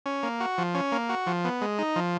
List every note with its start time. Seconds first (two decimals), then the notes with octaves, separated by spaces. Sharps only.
0.06 C#4
0.23 A#3
0.40 F#4
0.58 F3
0.75 C#4
0.92 A#3
1.09 F#4
1.27 F3
1.44 B3
1.61 G#3
1.79 D#4
1.96 F3